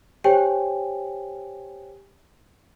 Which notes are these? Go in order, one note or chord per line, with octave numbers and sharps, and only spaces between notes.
G4 C5 C#5 G5 G#5